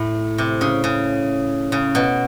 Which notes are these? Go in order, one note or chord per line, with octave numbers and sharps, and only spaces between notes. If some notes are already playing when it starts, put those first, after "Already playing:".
Already playing: A2
C3
C#3
C#3
C#3
B2